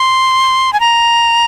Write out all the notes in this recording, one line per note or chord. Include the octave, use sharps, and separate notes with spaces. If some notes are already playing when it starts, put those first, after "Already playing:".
Already playing: C6
G#5
A#5